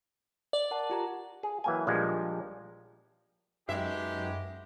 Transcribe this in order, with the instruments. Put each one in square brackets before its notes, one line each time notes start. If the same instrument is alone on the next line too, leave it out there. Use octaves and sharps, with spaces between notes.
[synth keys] D5
[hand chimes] A#4 F#5 A5
F4 G4 A#5
[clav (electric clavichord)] G#4
E3 F#3 A#3 G5 G#5
A#1 F3 G3 G#3
[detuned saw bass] F#2 [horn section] G#3 G4 [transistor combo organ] D#4 F#4 B4 [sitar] E5